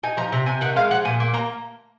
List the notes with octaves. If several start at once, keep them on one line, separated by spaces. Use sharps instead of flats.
D#4 G#5
F3 A#5
C3 A#5
C3 G#5
D#3 F#5
G#3 F5
F3 F#5
A#2 G#5
A#3
A#3 A#5